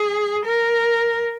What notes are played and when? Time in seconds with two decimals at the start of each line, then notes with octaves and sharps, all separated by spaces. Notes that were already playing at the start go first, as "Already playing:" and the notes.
Already playing: G#4
0.45 A#4